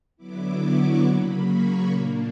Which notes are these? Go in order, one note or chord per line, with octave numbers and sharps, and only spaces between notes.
D3 F#3 B3 E4 D6
C#6
C#3 F#3 A#3 B5
C#6
A#2 A#3 D4